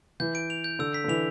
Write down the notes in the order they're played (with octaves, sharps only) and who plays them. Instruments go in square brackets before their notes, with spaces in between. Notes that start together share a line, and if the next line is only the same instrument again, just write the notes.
[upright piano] E3 [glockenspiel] G6
[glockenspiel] D7
F7
G6
[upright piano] D3 [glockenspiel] E6
[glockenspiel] B6
[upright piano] D3
[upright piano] E3 [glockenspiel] F7